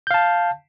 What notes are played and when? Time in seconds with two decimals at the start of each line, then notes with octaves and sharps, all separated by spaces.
0.07 G6
0.11 F5
0.14 A5